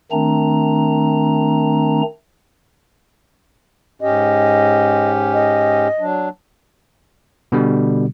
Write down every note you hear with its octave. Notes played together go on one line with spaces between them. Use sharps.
D#3 A3 C4 D4 A#5
G#2 C#4 G4 D#5
D#5
F#3 D4
B2 D3 G3